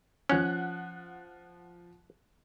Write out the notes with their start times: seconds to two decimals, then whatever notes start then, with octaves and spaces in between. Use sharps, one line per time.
0.29 F3 C#4 F#5 F#6